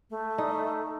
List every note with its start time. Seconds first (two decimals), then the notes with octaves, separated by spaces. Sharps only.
0.10 A3
0.38 D#4